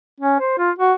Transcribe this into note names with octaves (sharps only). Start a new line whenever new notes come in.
C#4
C5
F4
F#4